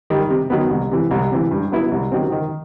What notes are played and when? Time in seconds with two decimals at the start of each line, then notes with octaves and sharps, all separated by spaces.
0.10 D#3 G3
0.30 C3
0.50 D#3 F#3 B3
0.70 C2
0.91 C3 E3
1.11 C2
1.32 C3 E3
1.51 G2
1.72 F#3 B3 E4 B4
1.91 C2
2.12 C3 D#3 F#3 C4
2.32 D#3